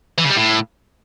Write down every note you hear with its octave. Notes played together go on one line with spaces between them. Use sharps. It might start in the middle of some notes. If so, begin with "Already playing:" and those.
E3
C#3
G3
A2